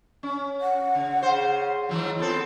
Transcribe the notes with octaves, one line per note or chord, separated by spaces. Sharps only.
C#4
F#5
C#3
C#3 C5
G#2 E3 F#3
B3 C4 F4 A4